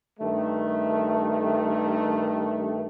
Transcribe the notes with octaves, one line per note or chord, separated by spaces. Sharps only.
G2 D#3 A3